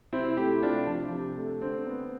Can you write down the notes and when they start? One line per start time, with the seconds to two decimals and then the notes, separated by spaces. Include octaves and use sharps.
0.13 C3 C4 E4
0.37 A3 E4 G4
0.62 C3 D4 F4
0.87 F3 D4
1.12 C3
1.37 A3
1.62 D3 C4
1.87 B3